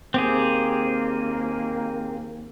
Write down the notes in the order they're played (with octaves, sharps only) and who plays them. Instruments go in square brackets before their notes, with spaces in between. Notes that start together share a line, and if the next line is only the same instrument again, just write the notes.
[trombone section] D#2 A#3 [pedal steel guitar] C4 G4 G#4